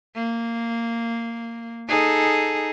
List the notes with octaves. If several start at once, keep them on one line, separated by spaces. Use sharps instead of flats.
A#3
D#4 G#4 A4